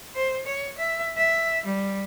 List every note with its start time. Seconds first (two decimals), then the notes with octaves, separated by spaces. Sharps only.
0.15 C5
0.46 C#5
0.78 E5
1.17 E5
1.65 G3